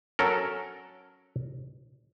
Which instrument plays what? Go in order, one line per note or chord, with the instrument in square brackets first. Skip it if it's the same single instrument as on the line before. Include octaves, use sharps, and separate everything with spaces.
[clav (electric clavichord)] F#3 C#4 A4 A#4